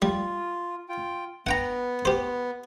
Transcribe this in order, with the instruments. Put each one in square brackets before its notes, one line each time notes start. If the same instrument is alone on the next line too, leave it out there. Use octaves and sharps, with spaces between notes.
[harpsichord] G3 [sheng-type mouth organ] F4
[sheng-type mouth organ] F4 G5
[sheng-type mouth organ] B3 [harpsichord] F#5 G5 A#5
[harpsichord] G4 C5